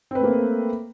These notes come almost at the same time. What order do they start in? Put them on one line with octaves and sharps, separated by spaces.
C4 B4 A3 A#3